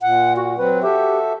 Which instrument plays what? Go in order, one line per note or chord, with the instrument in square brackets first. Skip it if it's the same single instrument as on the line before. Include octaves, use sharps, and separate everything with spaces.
[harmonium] A#2 [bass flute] F#5
[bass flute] F#4
[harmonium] F#3 C4 [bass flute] B4
[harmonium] F#4 A4 E5 [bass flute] G4